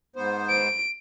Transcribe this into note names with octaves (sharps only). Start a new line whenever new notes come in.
G#2 B3 C5
D7